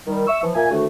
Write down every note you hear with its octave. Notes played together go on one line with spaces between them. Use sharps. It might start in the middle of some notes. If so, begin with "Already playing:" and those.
D#3 G3
E5 C#6 E6
E3 F3
A#2 A#3 E5 G#5
D2 A2 D3 D#3 A3 F#4